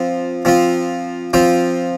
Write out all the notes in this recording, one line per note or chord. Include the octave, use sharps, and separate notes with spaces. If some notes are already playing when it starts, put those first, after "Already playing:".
Already playing: F3 C4 F4
F3 C4 F4
F3 C4 F4 G5